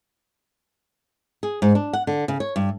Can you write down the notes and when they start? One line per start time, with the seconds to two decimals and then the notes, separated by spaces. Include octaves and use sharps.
1.43 G#4
1.62 G#2
1.75 D4
1.93 F#5
2.07 D3
2.28 C#3
2.40 C#5
2.56 G2